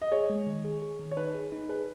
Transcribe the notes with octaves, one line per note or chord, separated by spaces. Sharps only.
D#5
G#4 C#5
G#3
D#3
G#4
G#4
D#3
C#5
D#4 B4
G#4
D#4
G#4 B4